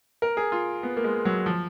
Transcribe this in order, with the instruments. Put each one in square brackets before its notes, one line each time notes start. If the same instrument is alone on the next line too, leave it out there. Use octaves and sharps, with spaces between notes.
[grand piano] A#4
G#4
F4
B3
A#3
G#3
F#3
F3